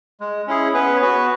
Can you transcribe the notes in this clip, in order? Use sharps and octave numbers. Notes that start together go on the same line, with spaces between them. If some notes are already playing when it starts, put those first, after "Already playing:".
G#3
C#4 E4 G#4
B3 C#4 B4
C#5
B3 F#4 B4